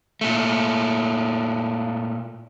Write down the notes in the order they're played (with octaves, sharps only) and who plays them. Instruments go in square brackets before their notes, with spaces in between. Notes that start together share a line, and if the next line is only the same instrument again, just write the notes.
[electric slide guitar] A#2 A3